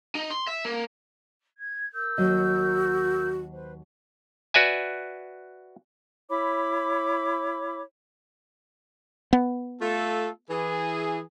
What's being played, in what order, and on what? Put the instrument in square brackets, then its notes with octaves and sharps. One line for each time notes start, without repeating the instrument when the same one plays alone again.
[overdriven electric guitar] D#4
C6
E5
A#3
[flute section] G#6
A#4 E6 G6
[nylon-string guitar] D#2 F#3 D#5 [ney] F#4
[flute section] B4 C5
[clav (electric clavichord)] F#4 B4 D5 E5 G#5
[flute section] E4 C#5 B5 D6
[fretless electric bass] B3
[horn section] A3 F4 A4
E3 G#4